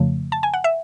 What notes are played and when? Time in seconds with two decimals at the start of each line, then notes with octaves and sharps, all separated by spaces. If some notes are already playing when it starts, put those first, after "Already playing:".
Already playing: F2 C#3 F3 A3
0.32 A5
0.43 G#5
0.54 F#5
0.64 E5